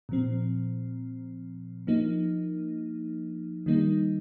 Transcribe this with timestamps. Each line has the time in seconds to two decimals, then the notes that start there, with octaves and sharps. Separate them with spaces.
0.09 A#2 F3 C4
1.87 F3 A#3 D#4
3.66 D#3 G3 A#3 D#4